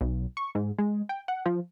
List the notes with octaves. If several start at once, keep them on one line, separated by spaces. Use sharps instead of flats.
B1
C#6
G#2
G#3
G5
F#5
F3